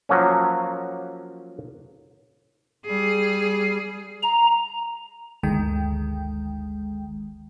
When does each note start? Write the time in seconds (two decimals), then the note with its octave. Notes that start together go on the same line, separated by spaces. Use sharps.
0.09 F3 F#3 A#3 C#4
2.86 G3 G#4
4.23 A#5
5.43 G1 D2 D#3 G#3 G5